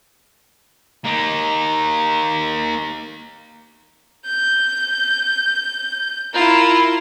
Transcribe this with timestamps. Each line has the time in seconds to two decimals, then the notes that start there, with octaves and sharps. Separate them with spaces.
1.05 A#3 D#4
4.25 G6
6.33 E4 F4 A#4